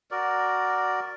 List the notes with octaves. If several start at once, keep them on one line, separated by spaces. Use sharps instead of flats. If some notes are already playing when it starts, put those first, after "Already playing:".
F#4 A#4 D5